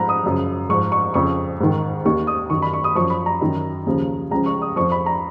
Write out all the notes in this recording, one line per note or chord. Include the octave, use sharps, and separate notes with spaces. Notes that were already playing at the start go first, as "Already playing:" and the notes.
Already playing: G#2 F3 A#5 B5
D#6
F#2 C#3 F3
G#2 F3 C#6
C#6
F2 C#3 F3 C#6
G#2 D#3
D#2 D#3 C#6
D#6
F#2 D#3 C#6
B5
C#6
D#6
F#2 F3 C#6
B5
A#5
F#2 D#3
D#2 C#3 F3
C#2 C#3 F3 A#5
C#6
D#6
F2 F3 C#6
B5
A#5